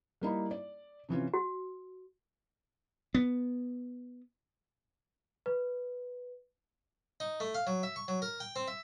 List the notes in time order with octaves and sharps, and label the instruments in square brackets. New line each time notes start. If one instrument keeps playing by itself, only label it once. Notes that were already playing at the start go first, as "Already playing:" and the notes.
[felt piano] G3 A#3 D#4 E4
D5
C3 E3 C#4 F4
[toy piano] F#4
[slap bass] B3
[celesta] B4
[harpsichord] D#4
A3
F5
F#3
E5
C#6
F#3
A#4
G5
C4
E5